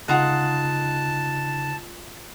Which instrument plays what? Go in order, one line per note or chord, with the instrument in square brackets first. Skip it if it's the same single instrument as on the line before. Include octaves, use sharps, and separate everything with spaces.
[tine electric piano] C#3 D#4 F#6 [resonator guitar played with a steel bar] G#3 F4 F#5 [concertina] A5